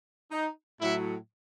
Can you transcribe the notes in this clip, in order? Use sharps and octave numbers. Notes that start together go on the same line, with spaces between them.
D#4
A2 F#3 E4